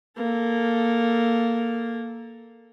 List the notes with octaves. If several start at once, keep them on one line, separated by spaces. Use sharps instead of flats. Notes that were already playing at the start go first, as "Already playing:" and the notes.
A#3 A4